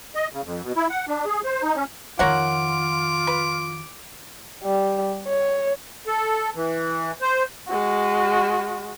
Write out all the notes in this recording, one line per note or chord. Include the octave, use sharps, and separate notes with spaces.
D#5
C#3
F2
B2
E4
F#5
D4
G#4
C5
D#4
C#4
F2 D#3 F4 A#4 C#5 F#5 D6
B4
G3
C#5
A4
E3
C5
G#3 F#4